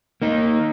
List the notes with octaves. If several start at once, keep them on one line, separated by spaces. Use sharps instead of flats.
A#3 D#4